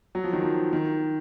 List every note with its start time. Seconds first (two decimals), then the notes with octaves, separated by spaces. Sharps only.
0.15 F#3
0.24 F3
0.33 D#3
0.43 F3
0.73 D#3